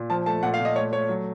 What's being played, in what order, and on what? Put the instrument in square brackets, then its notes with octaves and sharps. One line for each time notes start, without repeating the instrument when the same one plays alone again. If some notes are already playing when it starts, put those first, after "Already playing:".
Already playing: [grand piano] A#2
F3 A5
A3 A5
A#2 F#5
F5
A#2
D#5
A3 C#5
A3 C#5
F#3